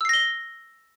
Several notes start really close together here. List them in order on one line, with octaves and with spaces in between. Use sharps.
E6 C7 A#6 G7